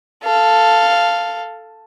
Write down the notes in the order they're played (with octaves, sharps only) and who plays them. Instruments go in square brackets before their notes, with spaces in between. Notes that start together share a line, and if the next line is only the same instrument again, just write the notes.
[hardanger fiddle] A4 F5